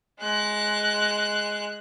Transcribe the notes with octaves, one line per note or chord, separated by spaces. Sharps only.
G#3 F#6